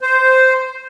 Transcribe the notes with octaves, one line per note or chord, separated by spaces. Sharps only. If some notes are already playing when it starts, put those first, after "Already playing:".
C5